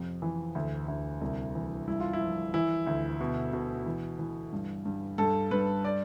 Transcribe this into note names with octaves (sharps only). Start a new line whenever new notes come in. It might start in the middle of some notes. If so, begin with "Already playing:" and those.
Already playing: F2 C3
E3
D2
D2
C2
E3
G2 E4
F4
E4
F3
E3 E4
D2
B2
B2
E3
E3
G2
G2
G2 A4
G2 B4
D5